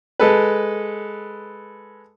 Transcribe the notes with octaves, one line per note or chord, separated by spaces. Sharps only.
G#3 A4 B4